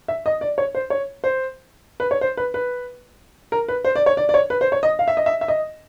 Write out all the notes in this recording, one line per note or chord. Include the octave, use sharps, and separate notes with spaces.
E5
D#5
D5
C#5
C5
C#5
C5
B4
C#5
C5
B4
B4
A#4
B4
C5
D5
C#5
D5
D5
C#5
B4
C5
C#5
D#5
F5
E5
D#5
E5
E5
D#5